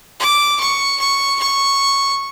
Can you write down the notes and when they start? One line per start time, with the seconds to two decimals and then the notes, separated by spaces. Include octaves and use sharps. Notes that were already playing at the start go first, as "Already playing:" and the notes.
0.20 D6
0.60 C#6
1.00 C#6
1.39 C#6